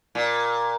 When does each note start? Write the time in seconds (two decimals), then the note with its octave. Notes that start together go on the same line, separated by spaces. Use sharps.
0.15 A#2